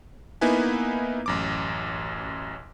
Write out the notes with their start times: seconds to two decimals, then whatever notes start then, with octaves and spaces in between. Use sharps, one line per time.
0.41 A#3 B3 D#4 E4 B4 G#5
1.26 A1 F#2 D6